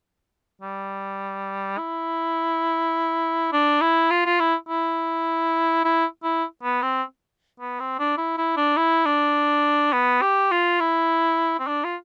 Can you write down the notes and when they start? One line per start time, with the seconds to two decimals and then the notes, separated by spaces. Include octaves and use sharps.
0.61 G3
1.78 E4
3.52 D4
3.81 E4
4.10 F4
4.25 F4
4.39 E4
4.68 E4
5.85 E4
6.23 E4
6.63 B3
6.82 C4
7.60 B3
7.80 C4
7.99 D4
8.17 E4
8.37 E4
8.57 D4
8.77 E4
9.06 D4
9.93 B3
10.22 G4
10.51 F4
10.80 E4
11.59 C4
11.67 D4
11.84 F4